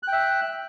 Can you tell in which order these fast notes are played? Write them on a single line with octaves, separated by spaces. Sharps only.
F#6 G5 E5